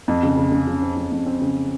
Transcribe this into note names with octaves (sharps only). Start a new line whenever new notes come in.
F2
C#3
C#3
C#3
C#3
C4
F2
F2
C4
C#3